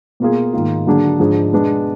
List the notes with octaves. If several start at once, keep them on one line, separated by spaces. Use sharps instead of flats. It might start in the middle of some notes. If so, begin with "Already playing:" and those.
B2 A#3 F4 G#4
G#2 D#3 A#3 F4
D3 F#3 A#3 D4 G#4
G#2 F3 G#3 D4 G#4
B2 G#3 B3 D4